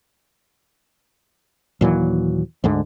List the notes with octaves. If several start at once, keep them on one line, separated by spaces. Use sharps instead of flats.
D#2 A#2 E3 F#3
D2 G#2 D3